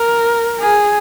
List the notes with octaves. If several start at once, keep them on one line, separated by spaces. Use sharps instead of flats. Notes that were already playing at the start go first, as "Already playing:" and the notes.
Already playing: A#4
G#4